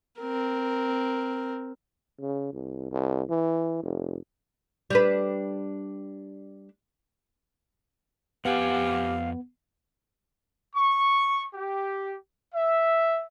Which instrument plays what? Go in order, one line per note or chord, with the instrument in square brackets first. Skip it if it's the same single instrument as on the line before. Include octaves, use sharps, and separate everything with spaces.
[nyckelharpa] C4 A#4
[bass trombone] C#3
C2
C2
E3
F1
[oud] G3 D4 B4
[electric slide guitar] F2 F#5 G#5 [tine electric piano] B3 [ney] G4 [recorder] F5
[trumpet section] C#6
G4
E5